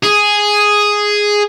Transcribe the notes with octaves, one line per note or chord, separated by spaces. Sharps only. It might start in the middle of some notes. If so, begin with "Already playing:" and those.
G#4